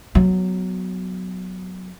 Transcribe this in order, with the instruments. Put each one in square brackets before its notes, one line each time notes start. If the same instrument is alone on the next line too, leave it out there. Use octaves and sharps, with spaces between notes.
[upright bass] F#3 B3